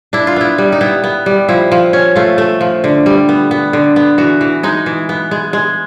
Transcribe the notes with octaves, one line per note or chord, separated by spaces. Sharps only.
D4 E4
F4
B3 E4
G3
D#4
B3 E4
B3
G3
F3 E4
F3
C#4
A3 F4
A3
F3
D3
G3
B3
B3
D3
B3
E3 F#4
E3
G#3 D#4
E3
B3
G#3
G#3